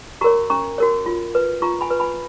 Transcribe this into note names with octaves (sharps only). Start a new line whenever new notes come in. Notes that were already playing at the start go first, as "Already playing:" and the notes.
F#4 A#4 C#5 A#5 C#6
C#4 A#5 C#6
F#4 A#4 C#5
F4
B4
F4 A#5 C#6
G#5 B5
B4
G#5 B5